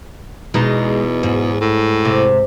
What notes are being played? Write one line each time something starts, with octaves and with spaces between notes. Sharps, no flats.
E2 B2 G#3 D#4
G#2
A2
C3